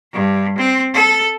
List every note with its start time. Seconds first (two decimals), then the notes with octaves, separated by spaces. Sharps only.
0.13 G2
0.58 C4
0.94 A4